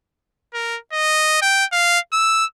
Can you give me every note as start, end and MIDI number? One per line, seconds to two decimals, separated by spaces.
0.54 0.78 70
0.93 1.39 75
1.42 1.65 79
1.72 1.99 77
2.13 2.45 88